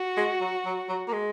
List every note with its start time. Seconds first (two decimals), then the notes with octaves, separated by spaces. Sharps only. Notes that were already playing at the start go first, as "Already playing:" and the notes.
Already playing: F#4
0.17 G#3
0.41 F#3
0.65 F#3
0.89 F#3
1.08 A#3
1.13 G#3